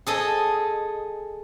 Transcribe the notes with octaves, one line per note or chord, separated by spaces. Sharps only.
G#4 A4 D#5